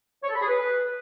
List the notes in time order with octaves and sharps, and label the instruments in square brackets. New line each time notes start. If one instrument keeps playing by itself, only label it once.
[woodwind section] C#5
A4
B5
G#4
B4